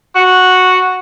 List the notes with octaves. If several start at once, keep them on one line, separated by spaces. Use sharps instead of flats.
F#4